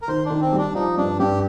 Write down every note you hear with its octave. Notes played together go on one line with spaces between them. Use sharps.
A#4
D#3 C5
D#3 D4
C4
G3
D4
F3 D#4
G2 D4
G2 G4